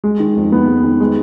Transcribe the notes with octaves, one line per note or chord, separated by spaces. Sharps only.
G#3
D#3
F2
B3
G#3
D#3
G#3